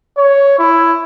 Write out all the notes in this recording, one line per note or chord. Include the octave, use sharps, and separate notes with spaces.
C#5
E4